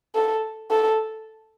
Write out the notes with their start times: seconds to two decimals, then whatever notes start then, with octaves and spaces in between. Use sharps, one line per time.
0.15 A4
0.71 A4